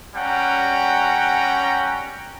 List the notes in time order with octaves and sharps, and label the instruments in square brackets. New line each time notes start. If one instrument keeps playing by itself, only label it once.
[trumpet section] G3 C#4 F#5 G5 A#5